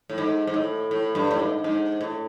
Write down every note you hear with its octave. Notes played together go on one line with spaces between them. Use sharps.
A2
G#2
G#2
A2
A2
G2
A2
G#2
G#2
A2